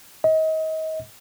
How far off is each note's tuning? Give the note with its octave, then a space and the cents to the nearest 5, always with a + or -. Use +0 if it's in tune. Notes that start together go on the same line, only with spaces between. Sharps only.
D#5 +30